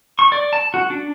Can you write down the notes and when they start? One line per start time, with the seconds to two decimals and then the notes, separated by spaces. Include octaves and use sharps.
0.19 C#6
0.32 D5
0.53 A5
0.74 F#4
0.90 D4